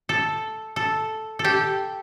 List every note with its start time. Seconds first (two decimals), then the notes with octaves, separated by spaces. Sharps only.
0.09 A4
0.76 A4
1.39 A4
1.45 G4